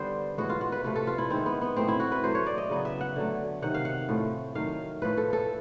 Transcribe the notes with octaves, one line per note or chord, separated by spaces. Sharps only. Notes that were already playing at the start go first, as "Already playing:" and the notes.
Already playing: D3 G3 B3 C5
A2 E3 G#3 B3 F#4
F4
F#4
B4
C3 F3 A3 B4
A4
F4
E4
D#3 G#3 B3 C4
B3
B3
A2 F#3 A3 C4
E4
F#4
B4
A2 F#3 A3 C5
C#5
D5
D#5
C#3 F#3 B3
E5
F#5
D3 F#3 A3
C3 D#3 F#3 F#5
F5
F#5
A2 F3 A3
D#3 F#3 A3 F5
A2 F3 A3 B4
A4
A4